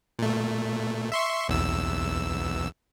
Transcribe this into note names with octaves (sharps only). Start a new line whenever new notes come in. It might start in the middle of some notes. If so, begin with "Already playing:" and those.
A#2 A3
E5 C6 C#6
B1 E2 E6